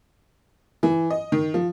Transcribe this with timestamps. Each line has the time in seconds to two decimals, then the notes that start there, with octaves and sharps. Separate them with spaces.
0.83 E3
1.10 D#5
1.32 D#3
1.54 F3